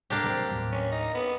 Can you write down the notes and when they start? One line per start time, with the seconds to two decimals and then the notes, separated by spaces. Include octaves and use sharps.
0.10 G#2 C3 G3 A#3 D4 G4
0.24 E1 F#3 G3 C4
0.51 D#2 A2 F#3
0.72 C#4
0.92 D#4
1.14 B3